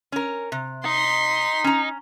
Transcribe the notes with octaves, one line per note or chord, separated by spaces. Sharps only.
C#4 A#4
C3
D#4 C6 B6
C#4 A#5